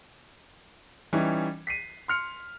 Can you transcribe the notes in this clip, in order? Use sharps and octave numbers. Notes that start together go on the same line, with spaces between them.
E3 G3 C#4 D#4
B6 C7 D#7
C6 F6 C#7